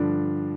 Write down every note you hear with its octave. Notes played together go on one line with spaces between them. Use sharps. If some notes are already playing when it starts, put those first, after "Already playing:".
Already playing: G2 D3 F3 D4